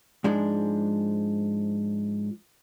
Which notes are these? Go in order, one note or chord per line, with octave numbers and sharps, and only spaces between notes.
G#2 F3 G#3 D4